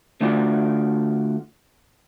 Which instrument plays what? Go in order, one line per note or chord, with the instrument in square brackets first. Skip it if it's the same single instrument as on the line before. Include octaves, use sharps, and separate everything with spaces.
[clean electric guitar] D3 A3 D4 F4 F#4 D5